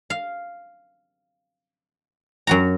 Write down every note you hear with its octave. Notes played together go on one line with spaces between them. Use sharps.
F5
F#2 F#4 A#5